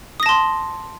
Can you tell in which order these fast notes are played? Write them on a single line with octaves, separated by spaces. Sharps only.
D#6 A#6 A5 C6